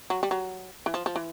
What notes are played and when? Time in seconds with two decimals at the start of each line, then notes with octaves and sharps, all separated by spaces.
0.10 F#3
0.23 G3
0.31 F#3
0.86 E3
0.94 F3
1.06 F3
1.16 E3